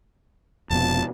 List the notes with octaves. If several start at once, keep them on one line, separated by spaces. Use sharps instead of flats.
F1 F2 B2 A5